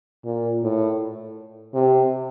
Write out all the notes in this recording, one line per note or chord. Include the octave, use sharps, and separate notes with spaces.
A#2
A2
C3